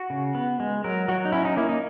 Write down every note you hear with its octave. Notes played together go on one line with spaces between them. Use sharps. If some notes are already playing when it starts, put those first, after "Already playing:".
Already playing: F#4
C#3
B3
G#3
F#3 A#4
F#3 F#4
D#4
C#4 E4
D#4
A#3 E4
D#4